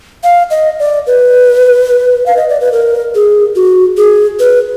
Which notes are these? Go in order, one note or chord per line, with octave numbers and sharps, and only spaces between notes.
F5
D#5
D5
B4
F5
D#5
D5
B4
A#4
G#4
F#4
G#4
B4